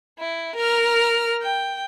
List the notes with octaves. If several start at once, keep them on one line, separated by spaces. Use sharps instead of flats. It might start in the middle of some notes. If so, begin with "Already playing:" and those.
E4
A#4 F6
G5